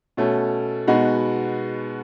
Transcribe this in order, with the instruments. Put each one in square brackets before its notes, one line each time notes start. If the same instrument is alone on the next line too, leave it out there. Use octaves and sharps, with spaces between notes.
[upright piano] B2 A3 C#4
B2 G#3 B3 D#4 F#4